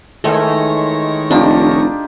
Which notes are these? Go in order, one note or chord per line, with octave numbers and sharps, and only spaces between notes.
D#3 E3 G#3 A3 C#5 A#6
F1 D4 D#4 F4 G4